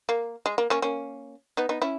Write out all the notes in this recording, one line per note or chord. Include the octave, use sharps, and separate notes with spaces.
A#3
G#3
A#3
A#3 C#4
A#3 C#4
B3 D#4
B3 D#4
C#4 E4